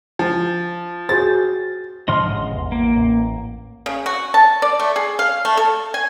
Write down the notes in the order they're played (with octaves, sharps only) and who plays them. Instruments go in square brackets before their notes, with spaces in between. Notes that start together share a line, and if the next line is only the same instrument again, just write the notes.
[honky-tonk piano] F3
[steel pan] F#4 G#4 C5 [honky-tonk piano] A6
[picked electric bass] G#2 D3 F3 [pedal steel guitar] D#5 C6 F6
[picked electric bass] A1 G#2 C#3
A1 E2
[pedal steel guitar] A#3
[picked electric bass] A1
[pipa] C#3
F#4
A5
D5
A3
G#4
F5
A3
A4
G#5